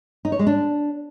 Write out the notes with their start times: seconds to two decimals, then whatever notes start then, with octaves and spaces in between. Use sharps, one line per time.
0.25 D#4
0.32 C#5
0.39 G#3
0.47 D4